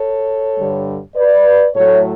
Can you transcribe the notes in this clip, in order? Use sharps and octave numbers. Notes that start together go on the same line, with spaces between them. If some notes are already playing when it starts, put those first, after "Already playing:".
Already playing: A4 C#5
G2 D3 G3
B4 D5
A2 F#3 A3 A4 C#5